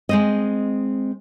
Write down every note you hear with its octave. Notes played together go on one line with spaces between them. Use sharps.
G#3 C4 D#5